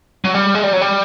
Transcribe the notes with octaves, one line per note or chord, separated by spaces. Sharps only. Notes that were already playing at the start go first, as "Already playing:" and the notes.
F#3
G3
G#3
G3
F#3
G3